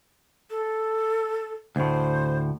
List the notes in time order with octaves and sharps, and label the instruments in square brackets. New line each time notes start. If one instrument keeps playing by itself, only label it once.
[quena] A4
[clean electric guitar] D2 A2 [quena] C5